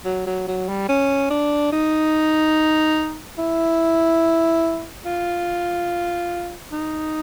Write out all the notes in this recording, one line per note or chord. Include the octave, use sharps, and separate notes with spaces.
F#3
F#3
F#3
G3
C#4
D4
D#4
E4
F4
D#4